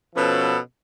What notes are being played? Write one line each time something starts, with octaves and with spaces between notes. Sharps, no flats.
B2 F3 B3 C#4 A4